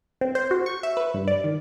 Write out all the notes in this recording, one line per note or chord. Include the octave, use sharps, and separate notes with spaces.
C4
C5
F#4
C#6
E5
B4
G2
D5
D#3